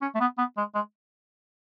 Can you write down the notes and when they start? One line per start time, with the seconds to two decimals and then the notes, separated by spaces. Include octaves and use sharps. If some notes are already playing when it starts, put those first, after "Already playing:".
0.01 C#4
0.15 A3
0.20 B3
0.38 B3
0.57 G#3
0.74 G#3